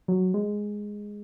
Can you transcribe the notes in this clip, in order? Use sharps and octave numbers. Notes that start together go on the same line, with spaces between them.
F#3
G#3